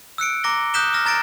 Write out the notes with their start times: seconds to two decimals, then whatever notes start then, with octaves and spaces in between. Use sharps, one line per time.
0.18 E6 F#6 C#7 D7
0.44 A#5 D6 A#6 G7
0.74 D#6 F#6 G6 B6 E7 G7
0.93 D#6 F6 A#6
1.06 A#5 A6 A#6 D7